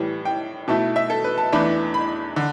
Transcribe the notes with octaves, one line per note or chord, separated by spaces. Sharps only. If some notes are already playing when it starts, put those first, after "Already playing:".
Already playing: A2 E3 G3
G5
B2 A3 E4 A5
E5
A4
B4
A5
E2 E3 A3 D4 B5
B5
D3